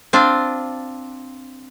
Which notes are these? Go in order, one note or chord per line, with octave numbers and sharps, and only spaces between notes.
C4 D4 F4